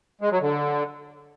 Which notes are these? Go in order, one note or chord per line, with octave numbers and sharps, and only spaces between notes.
G#3
F#3
D3